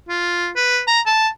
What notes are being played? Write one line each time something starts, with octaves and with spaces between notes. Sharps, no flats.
F4
B4
A#5
A5